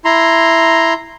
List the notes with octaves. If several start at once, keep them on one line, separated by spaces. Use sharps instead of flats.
E4 A#5 C6